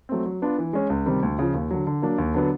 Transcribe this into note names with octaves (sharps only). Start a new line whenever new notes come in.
F#3 A3 C4
F#3
B3 D4 F4
E3
G#3 C#4
C#2
C3 D#3 G3 C4
D2
C#3 F3
D#2
D3 F#3
D3
F#3 A#3 D4
D#2
D3 F#3 B3 D4